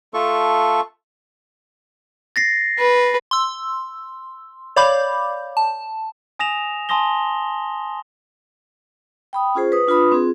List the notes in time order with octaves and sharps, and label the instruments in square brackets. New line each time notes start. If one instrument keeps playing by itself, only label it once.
[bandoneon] A3 F4 A4 C#6
[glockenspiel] A6 A#6 C7
[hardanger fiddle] B4
[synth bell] C6 E6
C#5 D5 F5 B5 D6 G6
A5
[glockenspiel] G#5 D#6 A#6 E7 F7
G#5 A5 C6 D#6 A#6 G7
[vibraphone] G5 B5 D#6
C#4 F4 G#4 C5
B4 D#6
D4 F4 B4 B5 D#6
C4 F4 G#4